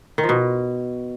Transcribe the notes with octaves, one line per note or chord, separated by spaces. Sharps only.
D#3
F3
B2